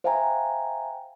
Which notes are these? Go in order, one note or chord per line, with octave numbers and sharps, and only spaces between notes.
C5 E5 F5 G5 G#5 A#5